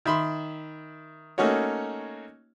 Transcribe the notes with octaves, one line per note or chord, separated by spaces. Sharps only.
D#3 E5 B5 C6
A3 A#3 C#4 D#4 F#4 C#5